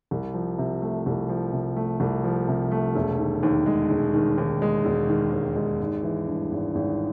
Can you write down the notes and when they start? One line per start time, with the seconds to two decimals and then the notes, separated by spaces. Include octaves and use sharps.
0.11 C2
0.34 F3
0.58 C3
0.82 A3
1.06 C2
1.29 F3
1.53 C3
1.76 A3
2.00 C2
2.24 F3
2.48 C3
2.71 A3
2.95 E1
3.18 D#3
3.43 D#2
3.66 G#3
3.90 E1
4.14 D#3
4.38 D#2
4.62 G#3
4.85 E1
5.09 D#3
5.32 D#2
5.56 G#3
5.80 G#1
6.03 E3
6.28 G2
6.52 G#1
6.75 G#1